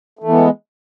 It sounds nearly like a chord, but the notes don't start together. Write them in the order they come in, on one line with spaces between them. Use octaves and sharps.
A3 E3 B3 G#3